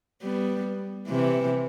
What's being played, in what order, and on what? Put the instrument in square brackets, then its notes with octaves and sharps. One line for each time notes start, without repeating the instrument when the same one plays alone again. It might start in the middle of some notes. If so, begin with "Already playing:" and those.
[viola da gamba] G3 B3
C3 E3